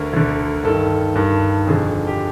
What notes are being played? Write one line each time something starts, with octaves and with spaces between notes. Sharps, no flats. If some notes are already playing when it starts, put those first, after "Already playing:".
Already playing: D2 D3 A#4
D2 D3
G2 D#3 A4
G2 D#3
F2 D3 G#4
G4